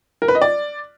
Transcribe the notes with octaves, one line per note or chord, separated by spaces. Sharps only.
A#4
B4
D#5
D5